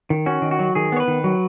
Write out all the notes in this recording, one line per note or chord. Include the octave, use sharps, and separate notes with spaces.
D#3
C#4 F#4
D#3
F#4
F#3
D#3 G#4
B3 C#5
B4
D#3
F#3